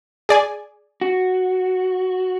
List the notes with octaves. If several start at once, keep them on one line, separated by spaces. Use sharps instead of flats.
G#4 D5 G#5
F#4